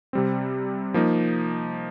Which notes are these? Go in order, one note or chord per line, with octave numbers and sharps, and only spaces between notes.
C3 G3 C4
F3 A#3 D#4